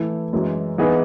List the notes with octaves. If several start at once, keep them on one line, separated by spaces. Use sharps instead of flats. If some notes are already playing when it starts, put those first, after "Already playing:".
Already playing: E3 A3 E4
F#2 E3 G#3
E3 B3 D#4 G#4 B4